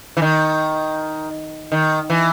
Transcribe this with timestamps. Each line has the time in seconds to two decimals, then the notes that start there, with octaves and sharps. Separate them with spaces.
0.17 E3
0.22 D#3
1.72 D#3
2.10 E3